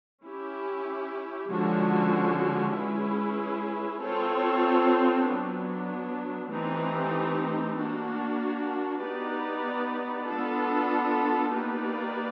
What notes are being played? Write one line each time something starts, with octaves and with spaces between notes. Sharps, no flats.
C#4 E4 G4
D3 F3 G#3 C#4 F#4
G#3 C#4 E4 G#4 B4
C4 F4 A4 C#5
F#3 B3 D4
E3 A3 C4 D#4 G4
A#3 D4 F#4
B3 D#4 G4 B4 D5
B3 D4 F4 A4
A#3 D#4 G4 B4 D5